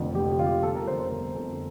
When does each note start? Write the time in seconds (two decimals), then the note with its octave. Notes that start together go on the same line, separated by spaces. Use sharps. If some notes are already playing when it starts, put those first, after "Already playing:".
Already playing: F1 F2 D3
0.15 F1 G4
0.32 G4
0.39 F2 D3 F4
0.47 G4
0.63 G1 A4
0.75 A#4
0.87 F2 D3 C5
0.99 C5
1.11 G1 A#4
1.35 F2 D3 A4